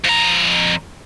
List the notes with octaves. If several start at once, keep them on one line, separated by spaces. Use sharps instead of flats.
F2 A#5